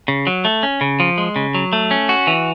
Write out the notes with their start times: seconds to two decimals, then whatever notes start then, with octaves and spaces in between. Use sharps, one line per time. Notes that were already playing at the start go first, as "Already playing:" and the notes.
0.08 C#3
0.27 F#3
0.45 A3
0.63 C#4
0.81 C#3
1.00 F3
1.18 G#3
1.36 C#3
1.55 F#3
1.73 A3
1.91 C#4
2.09 F#4
2.27 E3